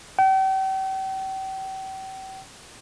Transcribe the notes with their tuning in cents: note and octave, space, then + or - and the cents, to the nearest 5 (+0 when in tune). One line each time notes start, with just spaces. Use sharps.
G5 -40